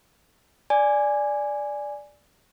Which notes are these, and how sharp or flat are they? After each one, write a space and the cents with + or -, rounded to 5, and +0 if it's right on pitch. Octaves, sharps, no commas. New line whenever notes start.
D5 +0 G#5 +0